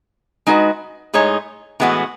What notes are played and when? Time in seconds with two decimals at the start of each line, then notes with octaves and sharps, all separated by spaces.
0.46 G#3 D#4 F#4 B4
1.13 A2 G#3 D#4 G#4 C#5
1.80 A2 E3 G#3 B3 F#4